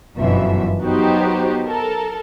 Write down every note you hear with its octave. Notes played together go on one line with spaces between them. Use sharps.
G1 F#2 B2 E3 F3 E5
F#3 B3 D#4 F#4 G4 C5
A4 A#4